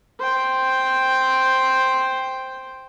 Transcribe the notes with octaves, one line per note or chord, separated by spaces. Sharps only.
C5 G5